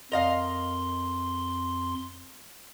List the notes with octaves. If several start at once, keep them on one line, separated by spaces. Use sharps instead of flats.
F2 A#4 D#5 F5 C6